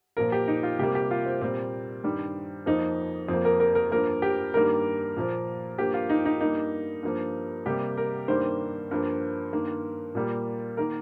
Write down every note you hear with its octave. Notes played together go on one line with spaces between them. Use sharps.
A#2 F3 A#3 A#4
G4
D#4
F4
C3 G3 A#3 G4
G4
F4
C4
A#2 G3 A#3 C4
G2 D#3 G3
F2 F3 A#3 D#4
F2 F3 A#3 C4
A#4
A#4
A#4
G2 F3 A#3 A#4
G4
G2 D#3 G3 A#3 A#4
A#2 F3 A#3
G2 F3 A#3 G4
F4
D#4
D#4
G2 G3 A#3 D#4
G2 F3 A#3
C3 G3 A#3 G4
A#4
G2 D#3 G3 A#3 C5
G2 F3 A#3
G2 D#3 A#3
A#2 G3 A#3
D#3 A#3 A#4